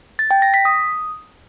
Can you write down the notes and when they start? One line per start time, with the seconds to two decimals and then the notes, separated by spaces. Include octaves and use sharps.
0.19 A6
0.31 G5
0.42 A#6
0.54 B6
0.65 D#6